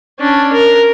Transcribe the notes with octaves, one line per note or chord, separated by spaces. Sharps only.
C#4 D4
A#4